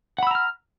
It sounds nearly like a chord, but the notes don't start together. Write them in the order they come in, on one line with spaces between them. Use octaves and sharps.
F#5 B5 E6 A#5 F6